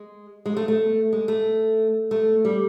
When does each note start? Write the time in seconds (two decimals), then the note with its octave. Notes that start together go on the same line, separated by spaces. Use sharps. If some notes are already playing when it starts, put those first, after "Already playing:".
Already playing: G#3
0.46 G#3
0.57 A3
0.68 A3
1.13 G#3
1.28 A3
2.11 A3
2.45 G3